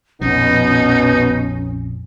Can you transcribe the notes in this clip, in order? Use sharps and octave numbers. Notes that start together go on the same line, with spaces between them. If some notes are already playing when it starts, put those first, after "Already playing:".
A#1 F2 B2 F3 C#4 D#4